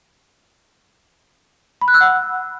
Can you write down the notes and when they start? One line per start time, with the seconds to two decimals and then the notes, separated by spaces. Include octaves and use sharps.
1.81 B5
1.88 F#6
1.94 E6
2.01 F#5